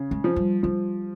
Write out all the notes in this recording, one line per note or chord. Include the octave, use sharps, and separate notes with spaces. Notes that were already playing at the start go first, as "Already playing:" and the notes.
Already playing: C#3
G#3
F3
G3
F3 G3